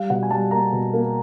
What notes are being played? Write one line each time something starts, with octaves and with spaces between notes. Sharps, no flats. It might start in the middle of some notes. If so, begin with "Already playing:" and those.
Already playing: G3 F5
B2 F#5
G#5
G3 A5
A#3 A#5
B2
A#3